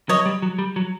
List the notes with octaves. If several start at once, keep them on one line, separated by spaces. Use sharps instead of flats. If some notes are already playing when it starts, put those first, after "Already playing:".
F#3 C#5 D#5
G3
F#3
G3
F#3